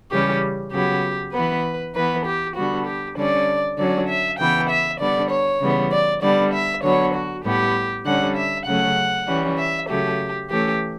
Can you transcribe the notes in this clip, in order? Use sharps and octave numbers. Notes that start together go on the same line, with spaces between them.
C#3 E3 G3 C#4 G4
C#3 F#3 B3 G4
E3 B3 B4
E3 B3 B4
G4
D3 G3 B3 F#4
G4
D3 G3 C#4 D5
D3 F#3 C#4 D5
E5
C#3 E3 B3 G5
E5
D3 G3 B3 D5
C#5
C#3 E3 G3 B3
D5
D3 G3 B3 D5
E5
D3 F#3 B3 C#5
F#4
A2 G3 B3 G4
D3 G3 C#4 F#5
E5
C#3 F#3 A3 C#4 F#5
E3 G3 C#4
E5
C#3 F#3 A3 G4
E3 A3 C#4 G4